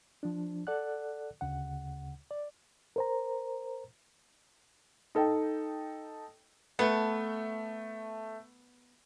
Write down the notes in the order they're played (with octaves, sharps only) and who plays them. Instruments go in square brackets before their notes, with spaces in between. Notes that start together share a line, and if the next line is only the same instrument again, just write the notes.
[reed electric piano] F3 D4
A4 D5 F#5 F#6
D2 C#3 F#5
D5
A#4 C5 A#5
[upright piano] D#4 A4 D#5 G5
[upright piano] A3 [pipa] B3